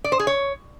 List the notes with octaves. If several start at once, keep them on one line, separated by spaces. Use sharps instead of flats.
D5
C5
G#4
C#5